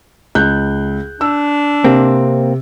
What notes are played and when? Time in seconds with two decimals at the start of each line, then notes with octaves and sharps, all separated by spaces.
0.35 C#2 F#6 G6
1.21 D4 E6
1.84 C3 A#3 C4